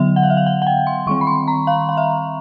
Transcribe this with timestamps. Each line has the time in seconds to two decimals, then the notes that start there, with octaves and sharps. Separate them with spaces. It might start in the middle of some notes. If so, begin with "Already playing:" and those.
Already playing: D3 F#3 B3 E5
0.16 F#5
0.23 F5
0.30 E5
0.37 F5
0.46 F#5
0.62 F#5
0.67 G5
0.87 C6
1.07 D#3 G3 C4 C#6
1.21 B5
1.27 C6
1.48 A#5
1.67 F5
1.89 F5
1.97 E5